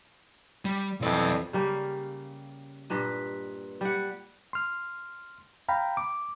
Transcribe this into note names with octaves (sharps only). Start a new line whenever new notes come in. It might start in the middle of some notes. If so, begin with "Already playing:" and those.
G3
B1 F2 E3 D5
C#3 G3 A#3
G2 A#2 B4 D#5
G3 F#5
C6 F6
F5 G5 A#5 B5
D6